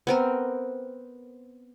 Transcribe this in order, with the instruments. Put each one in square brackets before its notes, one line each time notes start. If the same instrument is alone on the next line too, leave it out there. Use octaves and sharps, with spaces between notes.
[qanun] B3 C4 A#4